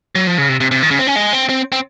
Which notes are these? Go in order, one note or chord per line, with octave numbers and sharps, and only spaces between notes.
F#3
F3
C#3
C3
C3
C3
D#3
C#3
C4
C#4
G#3
C4
C4
C4